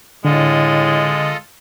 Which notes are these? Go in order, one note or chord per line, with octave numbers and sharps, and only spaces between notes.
A2 D3 G#3 F4 A4 D#5